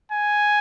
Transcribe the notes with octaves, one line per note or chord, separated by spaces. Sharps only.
G#5